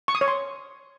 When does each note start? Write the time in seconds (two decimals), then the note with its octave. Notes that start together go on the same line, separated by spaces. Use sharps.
0.08 C#6
0.15 D#6
0.21 C#5
0.28 C6